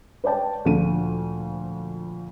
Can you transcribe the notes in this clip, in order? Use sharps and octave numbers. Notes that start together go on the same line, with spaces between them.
B4 C#5 D5 G5 A5
D2 A#2 F3 A4 D#7